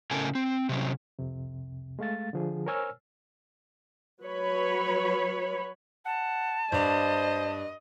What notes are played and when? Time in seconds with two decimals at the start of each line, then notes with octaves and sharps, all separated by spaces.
0.11 A2 C#3 C#4 A4 A#4 G#5
0.35 C4
0.69 C3 F#3 C#4
1.19 C2 F2 C3
1.99 G#3 A3 F5 A6
2.33 D3 F3 G#4
2.66 A#4 C5 C#5 G#5 E6 F6
4.22 F#3 B4 C#5 B5
6.06 F#5 A5
6.72 G2 C5 D5 D#5